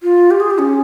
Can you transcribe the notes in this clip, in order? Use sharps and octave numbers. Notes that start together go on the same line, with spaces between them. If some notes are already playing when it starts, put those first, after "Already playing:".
F4
G4
G#4
G4
C#4